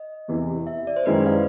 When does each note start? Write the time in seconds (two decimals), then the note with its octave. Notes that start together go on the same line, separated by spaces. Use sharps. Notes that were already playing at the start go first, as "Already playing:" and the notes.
Already playing: D#5
0.28 E2 C3 E3
0.67 E5
0.87 D5
0.96 C5
1.06 F#2 D#3 G#3 C#4 E4 B4
1.26 F5